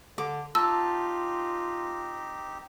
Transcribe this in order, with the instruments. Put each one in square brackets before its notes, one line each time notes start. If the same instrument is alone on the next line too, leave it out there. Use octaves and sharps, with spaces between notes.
[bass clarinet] D3 [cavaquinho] D6
[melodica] C4 D#4 G4 [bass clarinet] F4 [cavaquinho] A5 [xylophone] E6